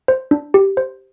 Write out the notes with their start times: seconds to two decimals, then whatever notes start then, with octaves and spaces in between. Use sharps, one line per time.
0.08 C5
0.31 D4
0.54 G4
0.77 C5